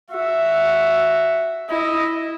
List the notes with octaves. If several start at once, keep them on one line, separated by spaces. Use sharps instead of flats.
F#4 E5
E4 D#5